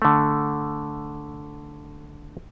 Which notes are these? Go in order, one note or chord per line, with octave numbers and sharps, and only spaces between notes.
D3 A3